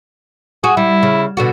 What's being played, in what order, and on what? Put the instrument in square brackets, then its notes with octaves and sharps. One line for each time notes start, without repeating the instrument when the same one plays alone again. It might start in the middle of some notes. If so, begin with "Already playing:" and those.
[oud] F#4 [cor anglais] G#4
[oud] G3 [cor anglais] E4
[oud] C#3
B2 D3 F#4